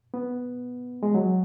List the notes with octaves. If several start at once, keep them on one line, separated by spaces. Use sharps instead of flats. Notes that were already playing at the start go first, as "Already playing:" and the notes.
B3
G#3
F#3